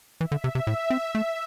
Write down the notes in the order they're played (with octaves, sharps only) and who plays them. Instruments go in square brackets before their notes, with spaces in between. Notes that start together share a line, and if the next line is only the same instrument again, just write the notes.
[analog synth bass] E3 [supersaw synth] E5
[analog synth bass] D3
C3
C3
A2
C4
[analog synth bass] A3 [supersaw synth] E5